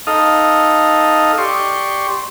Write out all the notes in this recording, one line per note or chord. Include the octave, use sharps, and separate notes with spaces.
D#4 A4 D#5 F5
G4 D5 C6 C#6